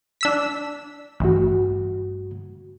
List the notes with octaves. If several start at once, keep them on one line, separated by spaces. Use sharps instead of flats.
D4 E6 B6
A1 G2 F#4